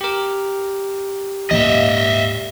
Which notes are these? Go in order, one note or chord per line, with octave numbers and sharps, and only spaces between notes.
G4 A#4
D#1 G#2 D#5 E5